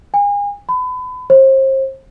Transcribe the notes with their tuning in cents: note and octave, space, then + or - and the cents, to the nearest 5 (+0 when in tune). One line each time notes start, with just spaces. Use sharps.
G#5 -35
B5 +30
C5 +35